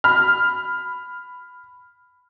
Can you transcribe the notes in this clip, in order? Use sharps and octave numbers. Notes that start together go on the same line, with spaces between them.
B5 F6